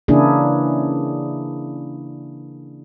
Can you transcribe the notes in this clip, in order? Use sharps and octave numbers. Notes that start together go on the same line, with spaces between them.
C#3 E3 A#3 D4 E4 G#4